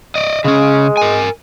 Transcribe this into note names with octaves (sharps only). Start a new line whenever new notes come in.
D5 D#5
C#3 G#3 C#4
A#4 G#5